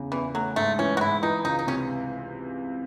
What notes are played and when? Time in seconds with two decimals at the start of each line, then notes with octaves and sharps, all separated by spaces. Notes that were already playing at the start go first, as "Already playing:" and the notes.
Already playing: E2 C#3
0.12 E2 E3
0.34 F#3 A3
0.56 G#2 A3
0.79 E3 C#4
0.97 F#4
1.00 G#2 E4
1.23 E3 D#4
1.45 C#2 D#4
1.59 D#4
1.67 C3 C#4